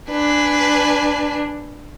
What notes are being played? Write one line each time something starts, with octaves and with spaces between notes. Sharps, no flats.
D4 B4 G#5